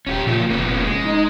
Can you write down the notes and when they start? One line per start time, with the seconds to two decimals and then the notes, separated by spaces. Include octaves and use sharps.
0.07 D#1 C#4 F#4 G4
0.27 A#2 C#3 F3 A3
0.50 F1 A#3 B3 C#4
0.84 G#3
1.05 D#4